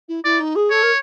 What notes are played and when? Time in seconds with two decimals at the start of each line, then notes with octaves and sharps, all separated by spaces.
0.08 E4
0.24 E4 D5
0.40 D#4
0.55 G#4
0.70 A4 C#5
0.82 A#4